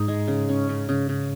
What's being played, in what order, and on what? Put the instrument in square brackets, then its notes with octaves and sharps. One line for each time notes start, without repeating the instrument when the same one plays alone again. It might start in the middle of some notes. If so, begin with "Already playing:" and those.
Already playing: [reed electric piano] G#2 [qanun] D#4 G#4
[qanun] G#3
C#3
C#4
C#3
C#3
C#3